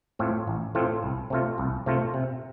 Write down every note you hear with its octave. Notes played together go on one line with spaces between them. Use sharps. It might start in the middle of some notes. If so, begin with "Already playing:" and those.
A2 A3 C4 F4
A1
A2 A3 C4 F4
C2
C3 A3 F4
C2
C3 A3 F4
C3